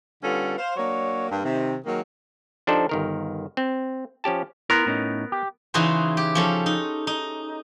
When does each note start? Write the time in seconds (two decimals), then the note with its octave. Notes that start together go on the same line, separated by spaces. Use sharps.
0.23 D3 G3 B3 C#4 F4 A4
0.58 C5 F5
0.76 F#3 A#3 D4 C#5
1.29 G2 A#3
1.43 C3 D#3
1.85 D#3 F#3 G#3 A#3
2.67 F3 D4 D#4 G4 A4 C5
2.89 G1 D#3 A#4
3.57 C4
4.24 F3 C#4 G4 A5
4.70 B3 E4 A#4 A#5 C6
4.86 A2 C#4 D#4
5.32 G4
5.74 C#3 E3 D#4 F#4 G#4 C5
6.17 G4
6.35 F3 C#4 A4
6.66 D#4
7.07 D#4